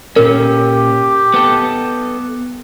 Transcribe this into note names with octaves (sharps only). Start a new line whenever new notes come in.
A#2 C#4 G4 A#4
B3 A4